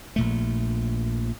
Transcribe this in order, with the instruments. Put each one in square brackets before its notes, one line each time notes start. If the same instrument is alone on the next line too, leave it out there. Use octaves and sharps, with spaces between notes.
[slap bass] A#1 A#2 A3